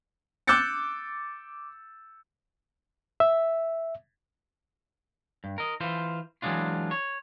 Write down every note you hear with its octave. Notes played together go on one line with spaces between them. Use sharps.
D6 E6 F#6 G6 A6 C#7
E5
G2
A#4 D#5
E3 F4 C5
E3 F#3 G#3 D4 F4
C#5